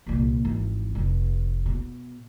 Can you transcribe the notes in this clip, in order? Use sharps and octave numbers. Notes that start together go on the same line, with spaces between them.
C2 A#2
G#1 E3
F1
B2